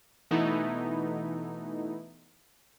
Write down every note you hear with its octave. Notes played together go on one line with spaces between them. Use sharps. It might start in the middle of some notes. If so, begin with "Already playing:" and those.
B2 E3 A3 B3 D#4 E4